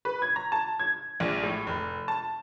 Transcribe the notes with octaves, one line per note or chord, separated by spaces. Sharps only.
B4
G#6
A#5
A5
G#6
A#1
A2
F1
A5